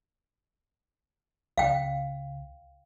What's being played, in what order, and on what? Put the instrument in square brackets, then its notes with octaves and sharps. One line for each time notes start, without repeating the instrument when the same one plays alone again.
[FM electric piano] C#2 C#3 [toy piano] F5 G5